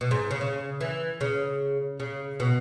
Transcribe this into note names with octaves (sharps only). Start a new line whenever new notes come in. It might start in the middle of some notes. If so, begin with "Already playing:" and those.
B2
G#2
C#3
C#3
E3
C#3
C#3
B2